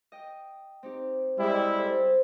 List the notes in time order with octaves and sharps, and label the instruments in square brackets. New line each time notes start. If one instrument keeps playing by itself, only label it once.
[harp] D#5 G5
C4 D#4 G4
[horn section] G3 G#3 E4
[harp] A4 C5